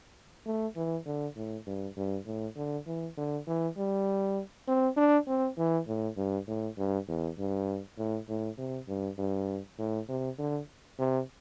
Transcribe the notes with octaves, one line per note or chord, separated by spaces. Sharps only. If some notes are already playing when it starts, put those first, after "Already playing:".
A3
E3
D3
A2
G2
G2
A2
D3
E3
D3
E3
G3
C4
D4
C4
E3
A2
G2
A2
G2
E2
G2
A2
A2
C3
G2
G2
A2
C3
D3
C3